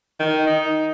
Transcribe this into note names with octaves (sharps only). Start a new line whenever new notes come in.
D#3
D#4